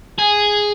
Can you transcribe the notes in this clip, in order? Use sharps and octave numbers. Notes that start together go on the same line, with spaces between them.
G#4